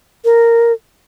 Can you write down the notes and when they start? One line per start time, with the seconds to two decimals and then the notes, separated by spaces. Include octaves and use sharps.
0.25 A#4